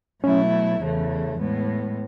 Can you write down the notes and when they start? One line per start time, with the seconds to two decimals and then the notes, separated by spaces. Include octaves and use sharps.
0.23 B2 F#3 A3 C#4 E4
0.80 E2 C#3 E3 A3
1.38 A2 G#3 B3